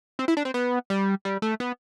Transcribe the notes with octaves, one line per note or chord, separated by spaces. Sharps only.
C4
E4
D4
C4
B3
G3
G3
A3
B3